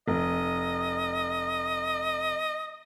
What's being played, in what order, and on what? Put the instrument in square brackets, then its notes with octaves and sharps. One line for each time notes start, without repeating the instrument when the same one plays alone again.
[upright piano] F1 [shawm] D#5